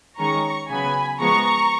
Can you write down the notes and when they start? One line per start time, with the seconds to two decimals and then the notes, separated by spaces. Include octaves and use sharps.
0.18 D#3 G#3 C#4 A#5 C#6
0.69 C#3 F#3 B3 G#5 B5
1.20 F3 G#3 B3 A#5 C#6